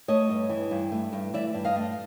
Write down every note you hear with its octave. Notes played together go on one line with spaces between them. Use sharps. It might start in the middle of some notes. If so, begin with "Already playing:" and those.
A3 C#5 D#5
G2
E3
G2
A3
G2
E3 D5 E5
G2
D#5 F5
A3